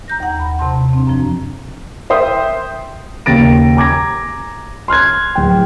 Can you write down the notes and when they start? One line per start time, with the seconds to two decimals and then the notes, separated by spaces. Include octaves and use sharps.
0.08 A#5 G6 A#6
0.20 D#2 F#5
0.40 B5
0.59 C3 A5 C6
0.93 C4 D4
1.07 F#2 F3
2.10 A#4 C5 E5 G5 D#6
3.26 D#2 C#3 A6 A#6 D7
3.76 G#5 A#5 D6 G#6 A#6
4.88 C6 F6 F#6 G#6
5.35 D1 G5